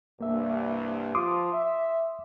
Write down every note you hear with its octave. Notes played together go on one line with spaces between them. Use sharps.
C2 G2 A#3 E5
F3 F4 C6 D6 D#6
E5